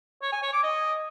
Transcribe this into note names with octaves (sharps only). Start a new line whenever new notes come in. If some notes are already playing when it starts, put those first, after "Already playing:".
C#5
G#5
C#5
D6
D#5